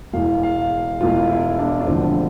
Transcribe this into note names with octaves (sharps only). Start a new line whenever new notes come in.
E1 E2 E3 F5
F5
E1 E2 E3 F4
E4
D4
D4
E1 D2 D3 F3 C4